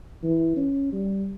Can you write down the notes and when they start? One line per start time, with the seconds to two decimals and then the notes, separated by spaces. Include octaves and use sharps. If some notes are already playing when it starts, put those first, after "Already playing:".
0.24 E3
0.56 C#4
0.93 G3